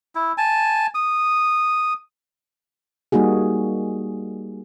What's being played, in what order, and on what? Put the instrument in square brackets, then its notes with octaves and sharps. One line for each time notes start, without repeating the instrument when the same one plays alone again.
[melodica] E4
G#5 A5
D#6
[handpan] G3 A#3 D#4 F#4 G#4